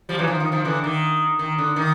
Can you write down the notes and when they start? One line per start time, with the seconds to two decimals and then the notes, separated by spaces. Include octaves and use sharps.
0.09 F3 G3
0.18 E3 F#3
0.27 D#3 F3
0.40 D#3
0.52 D#3 F3
0.65 D3 E3
0.84 D#3
1.39 D#3
1.58 D3
1.76 D#3